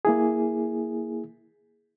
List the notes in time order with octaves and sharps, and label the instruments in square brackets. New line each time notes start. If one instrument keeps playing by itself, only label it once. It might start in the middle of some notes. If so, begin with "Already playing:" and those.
[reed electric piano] A#3 E4 G#4